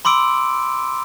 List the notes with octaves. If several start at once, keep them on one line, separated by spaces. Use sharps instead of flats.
B5 C6 D6 E6 D7